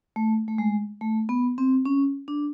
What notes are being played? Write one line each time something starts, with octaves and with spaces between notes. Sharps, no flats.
A3
A3
G#3
A3
B3
C4
C#4
D4